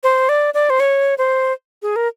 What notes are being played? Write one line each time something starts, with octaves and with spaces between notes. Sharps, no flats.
C5
D5
D5
C5
C#5
C5
G#4
A#4